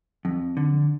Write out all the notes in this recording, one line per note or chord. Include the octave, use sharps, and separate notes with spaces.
F2
D3